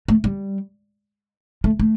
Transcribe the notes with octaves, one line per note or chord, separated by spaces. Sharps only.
A3
G3
A3
A3